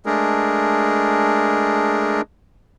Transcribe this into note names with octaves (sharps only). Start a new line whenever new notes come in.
G#3 A3 D4 G#4 A#4